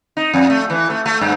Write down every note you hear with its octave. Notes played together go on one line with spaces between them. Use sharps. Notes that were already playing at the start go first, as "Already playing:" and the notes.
D#4
F2
A3
E3
A3
A3
G2